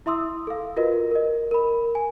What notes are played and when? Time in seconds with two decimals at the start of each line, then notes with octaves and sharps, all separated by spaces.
0.06 E4 E5 C6 D#6 E6
0.47 A4 F5
0.77 F4 F#4 A#4 B4 D#5
1.11 A#4 D#5
1.51 A#4 B5
1.95 G#5